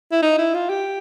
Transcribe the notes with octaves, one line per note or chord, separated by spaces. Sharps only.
E4
D#4
E4
F4
G4